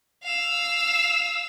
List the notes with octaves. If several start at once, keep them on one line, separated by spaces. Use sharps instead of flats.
F5 E6